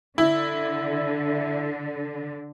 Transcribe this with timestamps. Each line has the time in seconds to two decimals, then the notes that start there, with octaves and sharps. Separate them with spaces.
0.18 D3 E4